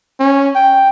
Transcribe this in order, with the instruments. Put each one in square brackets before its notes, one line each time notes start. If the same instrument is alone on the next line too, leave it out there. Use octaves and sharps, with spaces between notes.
[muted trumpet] C#4
G5